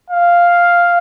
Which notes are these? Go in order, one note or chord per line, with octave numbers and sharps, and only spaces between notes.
F5